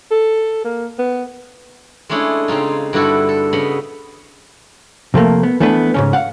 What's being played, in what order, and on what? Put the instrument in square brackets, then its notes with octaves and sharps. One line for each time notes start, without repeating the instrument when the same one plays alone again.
[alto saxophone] A4
A#3
B3
[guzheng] G#3 A3 C#4 D4 E4 G#4
C#3 C4 D#4 F4
G2 D3 E4 F#4 A4
A4
C#3 B3 D#5 B5
[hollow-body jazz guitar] C3 F3 A3 A#3
B3
E3 A3 B3 D4 B4
G#2 C#3 C#4
F5 F#5